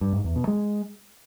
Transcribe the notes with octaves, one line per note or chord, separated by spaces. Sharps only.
G2
G#2
E2
B2
G#3